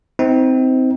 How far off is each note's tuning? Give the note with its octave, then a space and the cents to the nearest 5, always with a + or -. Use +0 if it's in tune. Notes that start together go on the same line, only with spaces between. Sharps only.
C4 -15 D#4 +35